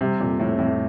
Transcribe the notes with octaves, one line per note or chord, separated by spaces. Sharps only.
C3 G3
F2 A#2
F2 A2
F2 A2